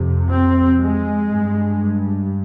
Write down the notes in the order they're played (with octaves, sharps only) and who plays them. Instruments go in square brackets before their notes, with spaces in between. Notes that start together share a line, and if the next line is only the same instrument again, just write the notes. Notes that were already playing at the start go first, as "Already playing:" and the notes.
Already playing: [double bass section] F2 C3
C4
G#3
G2